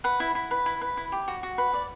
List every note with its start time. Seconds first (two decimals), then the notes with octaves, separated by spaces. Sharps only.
0.04 B4 F#5
0.20 E4
0.35 E4
0.51 B4
0.66 E4
0.81 B4
0.97 E4
1.12 G4
1.28 F#4
1.43 F#4
1.58 B4
1.74 D5